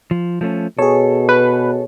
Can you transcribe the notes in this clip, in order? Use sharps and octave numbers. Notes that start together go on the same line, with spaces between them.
F3
F3 A3 C#4
B2 G#4 A4 C#5
B4